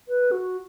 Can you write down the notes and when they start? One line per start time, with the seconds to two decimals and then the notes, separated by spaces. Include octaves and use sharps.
0.08 B4
0.31 F#4